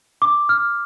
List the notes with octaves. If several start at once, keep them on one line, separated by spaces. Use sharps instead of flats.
D6
F6